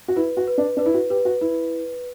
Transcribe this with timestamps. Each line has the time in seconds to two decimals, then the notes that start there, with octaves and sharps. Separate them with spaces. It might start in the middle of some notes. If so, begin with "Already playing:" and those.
0.08 F#4
0.16 E4 B4
0.37 F#4
0.47 B4
0.58 D4
0.77 D4 B4
0.86 E4
0.94 F#4
1.10 G4 B4
1.25 F#4
1.41 E4 B4